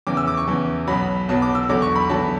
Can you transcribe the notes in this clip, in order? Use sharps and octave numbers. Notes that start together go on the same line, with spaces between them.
E2 C#3 E3 D6
E6
D6
C#6
E2 C#3 E3
B1 B2 F#3 B5
B1 B2 F#3 A5
D6
E6
E2 D3 F#3 D6
C#6
B5
E2 D3 F#3 A5